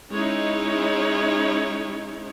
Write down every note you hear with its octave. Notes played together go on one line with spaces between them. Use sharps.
G#3 C#4 D#4 E4 C#5